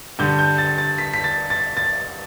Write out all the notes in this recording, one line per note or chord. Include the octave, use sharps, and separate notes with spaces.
G2 D3 G3 G6
G6
A6
A6
B6
B6
A6
A6
A6